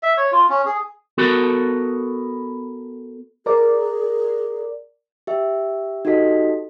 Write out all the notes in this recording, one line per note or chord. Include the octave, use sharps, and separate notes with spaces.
E5
C#5
F4
C#4
G#4
B3 F#4 A4 A#4
G#4 A#4 D5
G4 E5
D#4 F#4 G4 A4 D#5 B6